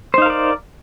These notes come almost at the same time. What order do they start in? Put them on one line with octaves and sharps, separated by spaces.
C5 D#4 F5 A#4 D5